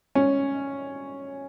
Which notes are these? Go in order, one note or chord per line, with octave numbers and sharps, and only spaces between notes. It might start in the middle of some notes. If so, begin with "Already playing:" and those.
C#4